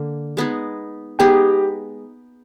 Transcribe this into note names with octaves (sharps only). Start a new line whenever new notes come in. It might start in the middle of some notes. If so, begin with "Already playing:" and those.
Already playing: D3 A#3
G#3 B3 D#4 G#4
G#3 B3 D#4 G4 G#4 G5